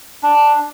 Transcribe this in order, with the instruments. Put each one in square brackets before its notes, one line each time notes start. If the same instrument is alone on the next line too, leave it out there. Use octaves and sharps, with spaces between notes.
[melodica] D4